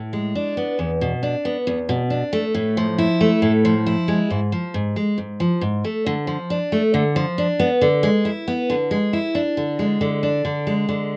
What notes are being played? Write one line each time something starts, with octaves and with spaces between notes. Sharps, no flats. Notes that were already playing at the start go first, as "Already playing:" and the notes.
Already playing: A2
G#3
D4
B3
E2
B2
D4
B3
E2
B2
D4
A3
A2
F3
E4
A3
A2
F3
E4
G#3
G#2
F3
G#2
G#3
G#2
F3
G#2
A3
D3
F3
D4
A3
D3
F3
D4
B3
D3
G#3
E4
B3
D3
G#3
E4
D4
D3
G#3
D3
D4
D3
G#3
D3